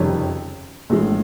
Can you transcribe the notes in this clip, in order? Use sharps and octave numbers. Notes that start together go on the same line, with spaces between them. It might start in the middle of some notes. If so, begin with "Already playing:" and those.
Already playing: F#1 F2 C3 D#3 G3 C#5
A#1 A2 E3 G#3